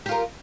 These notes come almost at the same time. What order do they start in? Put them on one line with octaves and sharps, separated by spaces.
G4 F4 A#4